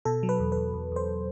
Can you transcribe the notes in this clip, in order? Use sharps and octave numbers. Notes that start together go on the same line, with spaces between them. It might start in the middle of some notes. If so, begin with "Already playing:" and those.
B2 A4
F#3
B4
E2
E2 B4
E2
E2 C5